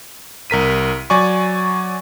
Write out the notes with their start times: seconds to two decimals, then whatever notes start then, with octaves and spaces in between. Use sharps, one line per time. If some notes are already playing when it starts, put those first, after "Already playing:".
0.50 C2 A#4 B6 D#7
1.10 F#3 D5 G#5 C#6